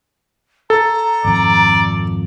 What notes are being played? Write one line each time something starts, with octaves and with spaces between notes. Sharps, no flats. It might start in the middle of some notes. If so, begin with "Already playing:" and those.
A4 A#5
G#1 F2 D5